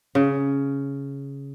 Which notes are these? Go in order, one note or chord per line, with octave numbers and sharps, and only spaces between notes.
C#3